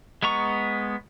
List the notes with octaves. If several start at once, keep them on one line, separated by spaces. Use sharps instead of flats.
G#3 B3 A#5 C#6